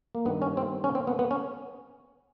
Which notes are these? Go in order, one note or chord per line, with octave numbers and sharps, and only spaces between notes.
A#3
G2 D#3 G3 B3
C#4
C4
C#4
C4
B3
B3
C#4